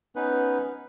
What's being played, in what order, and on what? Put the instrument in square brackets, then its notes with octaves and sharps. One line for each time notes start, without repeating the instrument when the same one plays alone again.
[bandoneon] B3 C#4 D#4 B4